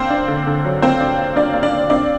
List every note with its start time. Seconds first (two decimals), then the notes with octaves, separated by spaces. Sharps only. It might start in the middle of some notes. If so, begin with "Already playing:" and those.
Already playing: A#3 C4 D4 C5
0.10 D4
0.28 D3
0.47 D3
0.65 F#3
0.82 A#3 C4 C5
1.00 D4
1.18 A#3
1.36 A#3 D4 D5
1.54 A#3
1.63 D4 D5
1.72 A#3
1.90 C4 D4 D5